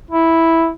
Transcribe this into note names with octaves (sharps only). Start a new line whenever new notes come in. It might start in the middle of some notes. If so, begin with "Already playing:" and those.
E4